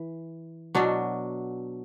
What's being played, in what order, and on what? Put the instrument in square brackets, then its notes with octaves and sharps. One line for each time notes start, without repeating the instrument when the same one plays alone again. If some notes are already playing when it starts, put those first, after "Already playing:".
Already playing: [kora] E3
B2 F#3 D4